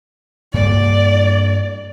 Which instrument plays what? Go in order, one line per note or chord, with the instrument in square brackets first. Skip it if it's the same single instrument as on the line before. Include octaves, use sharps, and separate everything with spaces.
[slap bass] G2 A#3 [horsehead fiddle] D5